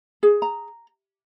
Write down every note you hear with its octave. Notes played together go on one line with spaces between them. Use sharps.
G#4
A#5